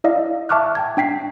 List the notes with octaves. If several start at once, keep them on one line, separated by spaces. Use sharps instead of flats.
E4 D5 D#5 F5
E5 A5 C#6 D6 F6 F#6
G5 A5 G#6
D4 G5 B6 C7